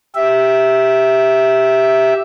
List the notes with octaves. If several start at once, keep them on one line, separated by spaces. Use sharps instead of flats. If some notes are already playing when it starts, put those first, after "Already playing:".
G4 E5